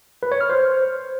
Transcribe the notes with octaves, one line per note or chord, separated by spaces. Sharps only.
B4
C#5
F6
C5